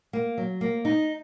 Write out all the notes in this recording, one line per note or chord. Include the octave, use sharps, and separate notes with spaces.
A#3
F#3
A#3
D#4